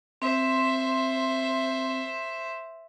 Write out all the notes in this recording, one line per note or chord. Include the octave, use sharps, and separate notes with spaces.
C4 C5 E5